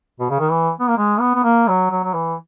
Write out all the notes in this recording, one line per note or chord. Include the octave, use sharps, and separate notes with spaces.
B2
C#3
D#3
E3
B3
A#3
G#3
B3
B3
A#3
F#3
F#3
F#3
E3